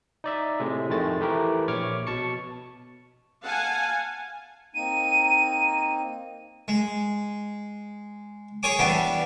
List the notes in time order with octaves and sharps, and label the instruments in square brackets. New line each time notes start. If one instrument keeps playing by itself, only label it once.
[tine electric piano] D#4 D5 E5
A2 C3 G#3
F2 D#3 G#3 A3 A6
E3 A3 G4 A#4 B4
A#1 C#5 C#6 D6 F6
B2 A5 C#6 C#7
[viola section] F5 F#5 G#5 A5
[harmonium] A#3 C4 D#4 [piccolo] D#7
[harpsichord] G#3
G#4 C#5 G#5 D6
E3 G3 B3 D4